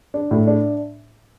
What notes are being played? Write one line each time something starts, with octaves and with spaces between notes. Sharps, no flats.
D4
A2
D4